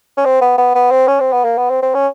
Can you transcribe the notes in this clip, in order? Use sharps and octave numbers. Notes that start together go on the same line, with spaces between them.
C#4
C4
B3
B3
B3
C4
C#4
C4
B3
A#3
B3
C4
C4
C#4